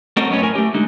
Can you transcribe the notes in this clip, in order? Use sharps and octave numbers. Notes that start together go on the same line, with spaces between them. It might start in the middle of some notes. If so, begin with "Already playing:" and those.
A3 C4 C#4 F#4 A#4 D#5
F#2 B3 C#4 C#5
A2 A#4 G#5
A3 G4
D3 G#3 D#4